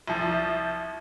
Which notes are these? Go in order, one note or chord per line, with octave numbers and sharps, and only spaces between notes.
C2 F3